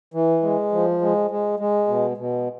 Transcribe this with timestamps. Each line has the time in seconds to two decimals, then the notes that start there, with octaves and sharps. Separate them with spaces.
0.14 E3
0.43 G#3
0.72 F3
1.01 G#3
1.31 G#3
1.60 G#3
1.88 B2
2.17 B2